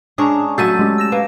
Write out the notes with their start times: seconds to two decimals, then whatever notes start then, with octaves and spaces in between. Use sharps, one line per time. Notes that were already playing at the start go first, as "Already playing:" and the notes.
0.18 G#3 C#4 D4 A#5 C#6 D#6
0.58 F#3 A3 A4 G6 A6 D#7
0.79 G#3 C#4 G4
0.98 E6 A#6 E7
1.12 A#3 B4